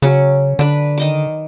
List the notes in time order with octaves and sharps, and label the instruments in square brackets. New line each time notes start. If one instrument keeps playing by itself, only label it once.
[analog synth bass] C#3 [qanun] F#3 C#4 D6
[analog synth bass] D3 [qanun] D4 B4
[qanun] D#3 D#5 D6